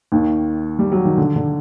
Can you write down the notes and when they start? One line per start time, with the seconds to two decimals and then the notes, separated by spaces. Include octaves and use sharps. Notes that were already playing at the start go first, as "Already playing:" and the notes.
0.12 D#2 D#3
0.79 G3
0.92 F#3
1.05 D#3
1.18 D3
1.36 D3